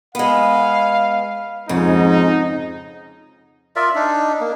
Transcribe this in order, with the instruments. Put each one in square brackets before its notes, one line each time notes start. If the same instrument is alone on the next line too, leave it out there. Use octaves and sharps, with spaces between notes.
[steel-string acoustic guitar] G#3 B3 [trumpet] F5
[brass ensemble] F2 G#2 [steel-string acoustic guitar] C#3 [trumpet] D#4
[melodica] F4 A#4 D5 E5
D4 D#4
A#3